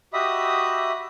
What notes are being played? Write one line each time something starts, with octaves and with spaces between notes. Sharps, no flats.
F#4 G4 D#5 E5 B5 D#6